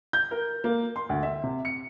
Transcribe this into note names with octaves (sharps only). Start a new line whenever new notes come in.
G6
A#4
A#3
C6
D2
E5
C3
C#7